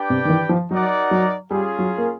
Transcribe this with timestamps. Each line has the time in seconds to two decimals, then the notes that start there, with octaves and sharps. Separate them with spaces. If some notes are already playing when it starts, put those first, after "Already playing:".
Already playing: D4 G4 B4 D5 G5
0.10 C3
0.25 D#3
0.29 E3
0.49 F3
0.70 F#3 D#4 F#4 A#4 D5 F#5
1.11 F#3
1.51 G3 C#4 F4 G#4
1.79 F#3
1.98 A#3